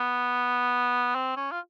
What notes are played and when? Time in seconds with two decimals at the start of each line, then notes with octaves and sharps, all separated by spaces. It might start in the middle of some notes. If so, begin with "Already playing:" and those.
Already playing: B3
1.15 C4
1.37 C#4
1.51 F4